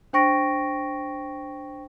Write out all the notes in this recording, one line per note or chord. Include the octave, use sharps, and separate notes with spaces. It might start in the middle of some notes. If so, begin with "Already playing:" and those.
D4 C5 G5 C#6 A#6 D7